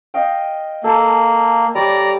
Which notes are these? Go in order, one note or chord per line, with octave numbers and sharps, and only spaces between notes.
D#5 F5 G5
A#3 A4 A5
G3 C#5 D5 A#5